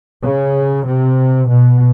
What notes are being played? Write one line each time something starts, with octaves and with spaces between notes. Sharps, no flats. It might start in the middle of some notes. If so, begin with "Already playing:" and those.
C#3
C3
B2